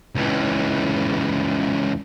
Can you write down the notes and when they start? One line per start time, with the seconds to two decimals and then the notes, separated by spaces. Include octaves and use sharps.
0.15 C#2 E3